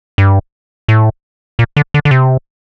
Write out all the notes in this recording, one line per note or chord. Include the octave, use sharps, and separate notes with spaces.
G2
A2
A#2
D3
D3
D3
C3